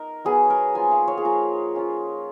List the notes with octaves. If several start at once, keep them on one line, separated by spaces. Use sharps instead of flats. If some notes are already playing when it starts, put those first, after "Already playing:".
Already playing: D#4 A#4
F#3 B3 D#4 G#4
A#4
F3 A#3 F4 G#5
F5
C#5
G#4
F3 A#3 F4 A#4
A#3 C#4 F4